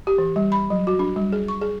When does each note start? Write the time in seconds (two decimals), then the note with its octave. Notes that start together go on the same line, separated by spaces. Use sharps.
0.07 G4
0.18 E3
0.36 G3
0.52 B5
0.70 F#3
0.87 F#4
0.99 D4
1.16 G3
1.32 G#4
1.48 C#6
1.61 G#4